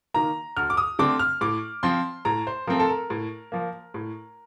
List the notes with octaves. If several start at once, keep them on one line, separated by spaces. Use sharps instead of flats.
D#3 A#3 A#5
D2 F6
D6
D#6
D3 A3 C4 D6
F6
A2 D6
F3 C4 C6
A2 A#5
C5
F3 A3 C4 A#4
A4
A#4
A2
F3 A#3
A2